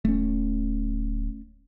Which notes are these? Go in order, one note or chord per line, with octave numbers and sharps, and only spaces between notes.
D1 A3 C#4